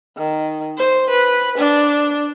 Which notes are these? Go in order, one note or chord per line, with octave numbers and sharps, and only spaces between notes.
D#3
C5
B4
D4